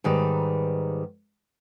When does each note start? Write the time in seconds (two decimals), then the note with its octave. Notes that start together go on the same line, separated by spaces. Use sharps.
0.04 G#2 D#3 G3 B4